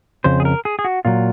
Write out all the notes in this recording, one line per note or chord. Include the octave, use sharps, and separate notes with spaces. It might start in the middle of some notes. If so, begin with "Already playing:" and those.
F2 C#3 C5
G#4
A#4
G#4
G#4
F#4
A#2 F#3 F4